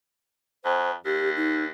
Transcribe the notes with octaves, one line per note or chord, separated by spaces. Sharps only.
F2 C5
D#2 G4
D#4